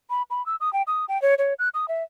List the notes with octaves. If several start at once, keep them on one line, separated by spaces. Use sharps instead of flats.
B5
B5
E6
D#6
G5
D#6
G5
C#5
C#5
F#6
D#6
E5